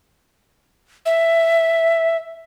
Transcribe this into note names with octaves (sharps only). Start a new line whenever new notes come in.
E5